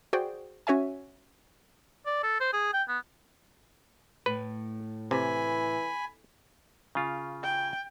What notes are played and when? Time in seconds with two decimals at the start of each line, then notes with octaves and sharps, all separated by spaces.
0.13 F#4 G#4 C5 D5 G5
0.67 C#4 F#4 C#5 E5 G#5
2.06 D5
2.23 A4
2.40 C5
2.53 G#4
2.73 G5
2.89 B3
4.26 A2 B4
5.11 C3 E3 G#5 B5
6.95 C#3 F4
7.43 G5